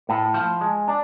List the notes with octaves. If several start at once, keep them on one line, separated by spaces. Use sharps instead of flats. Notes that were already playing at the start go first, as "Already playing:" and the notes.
A2
F3
G#3
D4